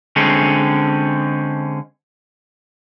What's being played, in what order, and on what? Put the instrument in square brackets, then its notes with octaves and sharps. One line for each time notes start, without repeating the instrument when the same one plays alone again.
[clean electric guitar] D3 G#3 C4 C#4